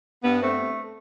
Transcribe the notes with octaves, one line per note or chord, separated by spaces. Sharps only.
G2 B3
A3 C4